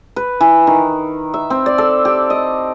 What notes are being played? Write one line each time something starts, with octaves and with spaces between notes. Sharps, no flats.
B4
E3
D#3
E5
C4
D5
A4
G4
D#5